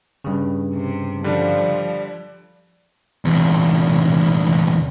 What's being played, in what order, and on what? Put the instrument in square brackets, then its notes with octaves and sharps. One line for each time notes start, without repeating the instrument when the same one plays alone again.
[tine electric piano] G2 C#3
[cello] C3
[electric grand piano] D3 G3 D4 [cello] F3 [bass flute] D5
[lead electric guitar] E2 C3